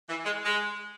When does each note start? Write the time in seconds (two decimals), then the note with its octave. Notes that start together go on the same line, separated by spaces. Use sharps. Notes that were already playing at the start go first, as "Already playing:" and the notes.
0.09 E3
0.25 G#3
0.45 G#3